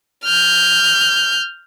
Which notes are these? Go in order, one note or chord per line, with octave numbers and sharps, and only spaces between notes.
F6 G6